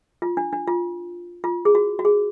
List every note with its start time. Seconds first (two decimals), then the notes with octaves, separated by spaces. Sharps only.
0.22 F4
0.37 D4
0.53 D4
0.67 F4
1.44 F4
1.65 G#4
1.75 F#4
1.99 F#4
2.05 G#4